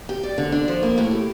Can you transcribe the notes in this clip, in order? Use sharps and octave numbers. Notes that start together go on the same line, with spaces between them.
G4
D5
D3
D4
F3
A#3
A2
G4